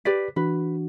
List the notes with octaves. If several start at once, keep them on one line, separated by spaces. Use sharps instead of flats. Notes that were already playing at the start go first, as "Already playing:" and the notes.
G4 B4 D5 B6
E3 D4 F#4 B4